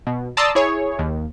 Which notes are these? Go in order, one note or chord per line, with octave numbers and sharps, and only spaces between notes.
B2
D5 A5 A#5 C6 D#6 E6
E4 G#4 C#5
D#2